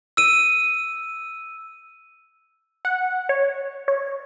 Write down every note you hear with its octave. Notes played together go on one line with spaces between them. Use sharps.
E6 D#7
F#5
C#5
C#5